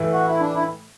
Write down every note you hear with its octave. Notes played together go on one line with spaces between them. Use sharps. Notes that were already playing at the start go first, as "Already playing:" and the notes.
Already playing: A2 E3 A3
F#4
E4
D4
E4